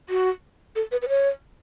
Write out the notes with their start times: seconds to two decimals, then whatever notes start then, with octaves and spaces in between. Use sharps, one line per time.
0.09 F#4
0.76 A4
0.92 B4
1.02 B4
1.09 C#5